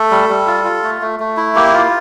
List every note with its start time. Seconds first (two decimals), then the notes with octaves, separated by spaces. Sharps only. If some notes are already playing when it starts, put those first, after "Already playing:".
Already playing: A3 A4
0.11 G3
0.29 G3
0.47 F4
0.65 F4
0.83 A3
1.02 A3
1.20 A3
1.37 E4
1.56 A#3 G4
1.74 F4